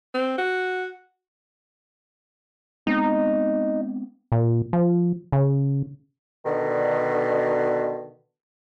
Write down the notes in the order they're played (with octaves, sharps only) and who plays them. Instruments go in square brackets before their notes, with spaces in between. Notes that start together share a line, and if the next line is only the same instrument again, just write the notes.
[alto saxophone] C4
F#4
[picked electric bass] G#3 B3 C4 [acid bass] D#4
[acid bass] A#2
F3
C#3
[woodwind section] B2 D3 D#3